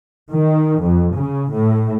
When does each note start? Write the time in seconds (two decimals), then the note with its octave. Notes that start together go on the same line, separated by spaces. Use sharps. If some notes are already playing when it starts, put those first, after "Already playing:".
0.32 D#3
0.82 F2
1.15 C#3
1.52 A2